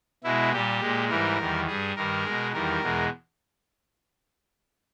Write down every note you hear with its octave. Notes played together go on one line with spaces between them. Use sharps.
B2 G#3 E4
A#2 G3 G4
A#2 G#3
G#2 E3 G3 A#4
E2 D#3 G3
G2 G3 G#4
G2 D#3 G3 A#4
G#3
B2
E2 D#3 G3 A#4
E2 B2 G#3